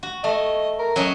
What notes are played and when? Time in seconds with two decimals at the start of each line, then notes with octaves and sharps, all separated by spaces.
0.03 F#4
0.24 A3 D#5
0.79 A#4
0.96 F#3 C#4 D#5